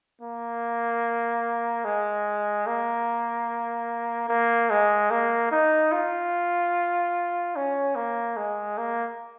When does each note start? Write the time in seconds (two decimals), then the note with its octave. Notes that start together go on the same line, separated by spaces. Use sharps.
0.21 A#3
1.84 G#3
2.67 A#3
4.29 A#3
4.70 G#3
5.11 A#3
5.52 D#4
5.92 F4
7.56 C#4
7.95 A#3
8.37 G#3
8.78 A#3